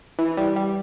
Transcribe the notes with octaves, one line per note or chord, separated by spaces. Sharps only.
E3
G3
G3